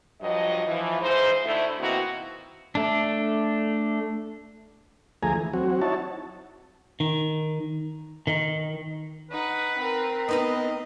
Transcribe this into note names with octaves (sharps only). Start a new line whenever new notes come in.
G2 F3 F#3 D#5
E3 F3
G#2 E3 D#4 C5
D2 D3 A3 E4
B2 D#3 A#3 C4 E4 F#4
A3 D4
D2 F3 A3 G#4 G#5 A#5
E3
F#3 C4 F#4
D#4 E4 F#4 C#5 A5
D#3
D#3
D#4 B4 F#5
C4 A#4
B3 D#4 B4 D#5